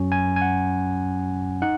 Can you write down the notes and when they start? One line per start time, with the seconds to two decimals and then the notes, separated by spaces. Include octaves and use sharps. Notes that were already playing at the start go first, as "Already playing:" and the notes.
Already playing: F#2 F#3 C#4
0.12 G#5
0.36 G#5
0.42 F#5
1.62 D#4 F#5